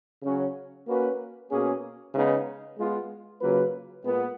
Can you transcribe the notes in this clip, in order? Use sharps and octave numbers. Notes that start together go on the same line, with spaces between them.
C#3 F#3 C#4
A#3 C#4 F#4 B4
B2 A#3 C#4 G#4
C#3 G#3 B3 D#4
G#3 B3 F4
C#3 F#3 A#3 F4 B4
A#2 G#3 B3